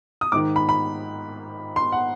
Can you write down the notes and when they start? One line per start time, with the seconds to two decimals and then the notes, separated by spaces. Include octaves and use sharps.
0.21 D#6
0.32 G#2 D#3 D6
0.56 B5
0.69 B5
1.76 C6
1.92 F#5